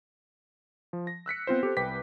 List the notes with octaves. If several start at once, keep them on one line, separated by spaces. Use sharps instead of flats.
F3
A#6
E6 F#6 B6 C#7
B3 C4 F4 C5
G4 A4 C5
C2 B4 G5 D6 B6